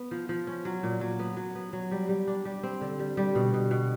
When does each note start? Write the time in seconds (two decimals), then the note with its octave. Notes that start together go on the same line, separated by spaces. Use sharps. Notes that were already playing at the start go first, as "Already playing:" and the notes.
Already playing: B3
0.11 F3
0.29 F3
0.47 C#4
0.65 F#3
0.83 A#2
1.01 F#3
1.19 B3
1.37 F#3
1.55 B3
1.73 F#3
1.91 G3
2.09 G3
2.27 D4
2.45 G3
2.63 C4
2.81 D3
2.99 G3
3.17 G3
3.35 B2
3.54 B2
3.71 B2